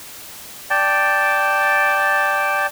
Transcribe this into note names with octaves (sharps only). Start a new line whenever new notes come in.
D5 G5 A5